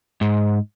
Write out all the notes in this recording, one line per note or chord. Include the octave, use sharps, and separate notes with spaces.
G#2